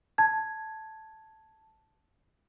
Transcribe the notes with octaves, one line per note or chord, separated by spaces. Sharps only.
A5 G#6